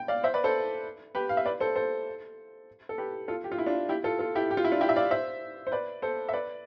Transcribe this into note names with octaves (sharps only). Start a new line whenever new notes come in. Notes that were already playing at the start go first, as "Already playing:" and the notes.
Already playing: G5
D5 F5
C5 E5
B4 D5
A4 C5
G4 B4
F5
E5
B4 D5
A4 C5
A4 C5
A4
G4 B4
F4 A4
G4
F4
E4
D4 F4
E4 G4
F4 A4
F4 A4
E4 G4
G4
F4
E4
D4 F4
E4 G4
E5
D5 F5
C5 E5
C5
B4 D5
A4 C5
E5
B4 D5